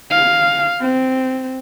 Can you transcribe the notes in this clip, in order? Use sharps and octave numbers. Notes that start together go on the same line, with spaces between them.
F5
C4